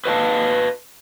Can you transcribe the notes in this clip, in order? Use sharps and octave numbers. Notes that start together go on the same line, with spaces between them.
B4 D#5 F5 A5